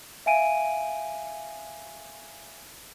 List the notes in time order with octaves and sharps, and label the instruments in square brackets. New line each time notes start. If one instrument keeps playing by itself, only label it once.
[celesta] E5 F5 G#5 D7 D#7